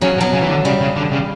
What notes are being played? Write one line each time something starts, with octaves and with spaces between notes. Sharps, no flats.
C#3 F#3
B2
F#3
C#3
E3
D3
C#3 G3
C#3
D3
C#3